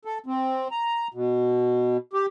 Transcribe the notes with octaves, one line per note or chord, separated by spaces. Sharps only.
A4
C4
A#5
B2
G4